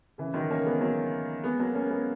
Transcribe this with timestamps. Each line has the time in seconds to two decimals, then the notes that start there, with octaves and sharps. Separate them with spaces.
0.18 C#3 E3
0.34 D#3 F#3
0.51 A#3 C#4
0.66 G#3 B3
0.81 F#3 A#3
1.44 G#3 B3
1.59 F#3 A#3
1.74 A#3 C#4
1.90 G#3 B3